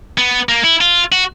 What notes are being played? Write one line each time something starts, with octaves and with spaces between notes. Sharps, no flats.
B3
A#3
E4
F4
F#4